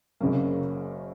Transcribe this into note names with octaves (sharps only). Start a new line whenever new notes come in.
F#1 F#2 C#3 F#3 A#3